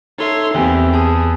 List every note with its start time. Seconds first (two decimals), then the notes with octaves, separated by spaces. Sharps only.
0.18 D#4 A4 C#5 E5 C6
0.54 E2 A#3 C4 G4 E5
0.94 G#4 A5 D#6